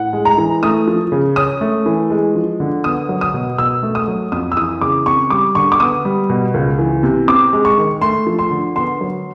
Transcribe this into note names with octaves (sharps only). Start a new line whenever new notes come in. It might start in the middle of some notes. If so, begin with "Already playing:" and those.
Already playing: A2 F#5
G#3
A#5
E3
A3 D#6
F3
C#3
C#4 D#6
A3
E3
G#3
F3
D3
B3 D#6
F#3
D#6
B2
B2 E6
A3
D#6
F#3
F2 D#6
E6
E3 D#6
C#3 D6
C4 C#6
G3 D6
D3 C#6
D6
B3 D#6
G3
B2
C#2
E3
C3
C4 D6
G#3
C#6
D#3
A3 C6
F3
C6
D3
B3 C6
F#3